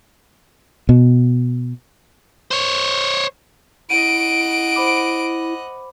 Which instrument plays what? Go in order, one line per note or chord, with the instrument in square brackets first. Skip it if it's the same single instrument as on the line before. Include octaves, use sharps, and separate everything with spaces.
[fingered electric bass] B2
[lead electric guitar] C5 C#5
[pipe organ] E4 [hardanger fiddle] D#5 F#5 [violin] D7 [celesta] D#7
[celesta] C5 B5 D6